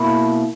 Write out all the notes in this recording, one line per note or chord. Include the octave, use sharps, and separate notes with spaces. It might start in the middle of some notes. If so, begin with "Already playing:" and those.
Already playing: B2 A#3 E4